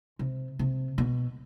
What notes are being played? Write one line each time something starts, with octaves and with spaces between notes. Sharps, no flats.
C3
C3
B2